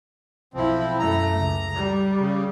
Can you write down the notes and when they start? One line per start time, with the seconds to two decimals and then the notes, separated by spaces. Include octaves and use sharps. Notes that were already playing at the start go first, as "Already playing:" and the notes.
0.54 B1 F3 C4 E4
0.99 F#2 A3 A#5
1.38 C#2
1.74 G3
2.18 C#3